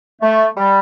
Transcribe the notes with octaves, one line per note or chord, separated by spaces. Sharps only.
A3
G3